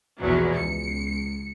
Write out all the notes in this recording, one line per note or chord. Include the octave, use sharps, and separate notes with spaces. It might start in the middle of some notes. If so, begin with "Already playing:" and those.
A#1 E2 B2 F3 F#3
C#2 C#7